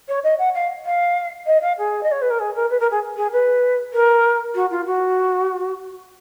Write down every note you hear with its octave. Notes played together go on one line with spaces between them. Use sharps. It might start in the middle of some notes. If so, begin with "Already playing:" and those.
C#5
D#5
F#5
F5
F5
D#5
F5
G#4
D#5
C#5
B4
A#4
G#4
A#4
B4
A#4
G#4
G#4
B4
A#4
F#4
F4
F#4